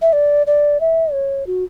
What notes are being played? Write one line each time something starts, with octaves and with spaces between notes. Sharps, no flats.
E5
D5
D5
E5
C#5
F#4